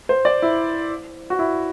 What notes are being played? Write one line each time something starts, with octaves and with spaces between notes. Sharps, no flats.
C5
D5
E4
F#4
E4